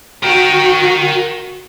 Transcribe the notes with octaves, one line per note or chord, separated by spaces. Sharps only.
F#4 A#4 G5